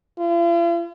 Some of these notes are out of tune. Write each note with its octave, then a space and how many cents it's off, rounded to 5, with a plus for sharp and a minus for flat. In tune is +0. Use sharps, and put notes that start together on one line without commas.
F4 -45